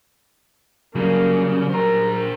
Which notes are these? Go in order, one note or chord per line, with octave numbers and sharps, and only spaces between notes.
C#3 F#3 G3 A#3
A#4 C5 A#5